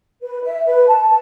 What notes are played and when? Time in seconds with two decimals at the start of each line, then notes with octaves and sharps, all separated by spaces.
0.22 B4
0.43 E5
0.66 B4
0.88 A5